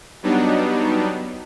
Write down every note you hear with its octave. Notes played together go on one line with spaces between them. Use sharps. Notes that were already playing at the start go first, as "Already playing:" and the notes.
F#3 G3 B3 D4 D#4